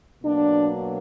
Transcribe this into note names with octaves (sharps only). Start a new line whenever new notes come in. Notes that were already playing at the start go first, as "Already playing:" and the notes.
B2 F#3 A#3 D4